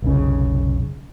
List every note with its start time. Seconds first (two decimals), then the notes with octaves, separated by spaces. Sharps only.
0.02 F1 B1 C#3